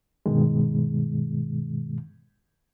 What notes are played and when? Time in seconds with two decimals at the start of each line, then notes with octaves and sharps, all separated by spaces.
0.26 G2 B2 D#3 G#3